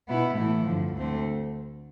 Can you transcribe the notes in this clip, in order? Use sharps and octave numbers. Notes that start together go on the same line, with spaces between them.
B2 B3 E4
A2 E3 A3 E4
G2 D3 F3
D2 D3 A3 C4